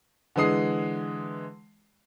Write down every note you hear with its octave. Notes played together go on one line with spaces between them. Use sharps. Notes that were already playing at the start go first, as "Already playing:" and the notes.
D3 E3 G#3 D#6 C7